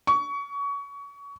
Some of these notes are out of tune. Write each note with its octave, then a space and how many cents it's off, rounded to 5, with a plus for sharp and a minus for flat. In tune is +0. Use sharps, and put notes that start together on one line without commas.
C#6 +25